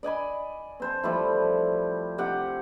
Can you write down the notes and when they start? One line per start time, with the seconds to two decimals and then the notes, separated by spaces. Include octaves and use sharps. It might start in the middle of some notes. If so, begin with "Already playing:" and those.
0.03 D5 D#5 G#5 B5
0.80 C4 C5 A5
1.03 F3 G3 A3 E4
2.18 C3 G4 F#5